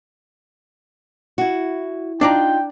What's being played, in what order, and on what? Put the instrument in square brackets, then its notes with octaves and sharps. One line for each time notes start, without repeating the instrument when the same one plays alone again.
[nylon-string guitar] E4 F#4
[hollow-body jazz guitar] D4 D5 A#5 [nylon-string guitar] D#4 F4 [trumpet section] G5